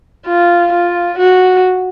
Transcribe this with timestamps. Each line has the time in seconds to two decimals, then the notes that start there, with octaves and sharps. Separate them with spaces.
0.27 F4
0.72 F4
1.19 F#4